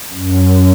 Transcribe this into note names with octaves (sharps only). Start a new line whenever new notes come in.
F#2